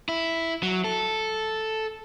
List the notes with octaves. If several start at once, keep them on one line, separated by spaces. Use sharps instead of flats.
E4
F#3
A4